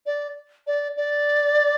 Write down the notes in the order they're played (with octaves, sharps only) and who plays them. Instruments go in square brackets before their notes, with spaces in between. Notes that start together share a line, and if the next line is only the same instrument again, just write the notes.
[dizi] D5
D5
D5